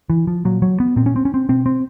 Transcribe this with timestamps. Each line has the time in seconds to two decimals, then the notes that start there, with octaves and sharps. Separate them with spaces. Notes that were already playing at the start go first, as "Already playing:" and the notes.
0.10 E3
0.27 F3
0.45 A#2 F#3
0.62 F#3
0.80 B3
0.96 A#2 C4
1.06 C#4
1.16 C4
1.25 C#4
1.34 C4
1.49 B2 C4
1.66 C4